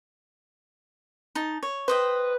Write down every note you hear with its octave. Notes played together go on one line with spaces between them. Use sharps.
D#4 A5
C#5
B4 C5 D#5 G5